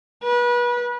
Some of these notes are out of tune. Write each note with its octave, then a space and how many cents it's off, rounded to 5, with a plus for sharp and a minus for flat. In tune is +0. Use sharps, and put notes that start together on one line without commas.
B4 -30